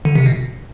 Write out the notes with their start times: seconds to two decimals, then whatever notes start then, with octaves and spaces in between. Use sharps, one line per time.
0.05 D3
0.16 C3
0.26 B2